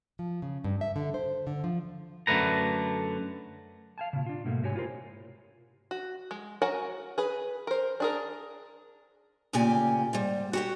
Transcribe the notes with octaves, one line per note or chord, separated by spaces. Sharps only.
F3
C#3
G2
E5
D3
C5
D3
F3
F#2 D3 A3 B4 A#5
F5 G#5 A5
A#2 C#3
D4 F4
G#2 B2 A3 A#3
G#2 C3 F#4 G4 C#5 G#5
E4 F4 G4 A#4 C5
F#4
G#3
F#4 A#4 C#5 F#5 G#5
G#4 B4
A#4 C5
D4 G#4 A#4
D2 A#2 C#3 G4 G#5
G#2 G3
F#4 G4 F#5